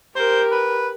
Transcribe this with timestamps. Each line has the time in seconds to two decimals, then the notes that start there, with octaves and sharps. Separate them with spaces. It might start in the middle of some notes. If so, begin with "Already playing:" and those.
0.15 G4 A#4 C5
0.51 B4